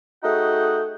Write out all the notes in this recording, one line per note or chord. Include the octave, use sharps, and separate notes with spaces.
A3 D#4 F#4 G#4 F#5 G5